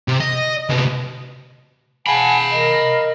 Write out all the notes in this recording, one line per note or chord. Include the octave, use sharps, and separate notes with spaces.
C3
D#5
C3 B3
F5 F#5 G#5 A5 B5
A#4 D#5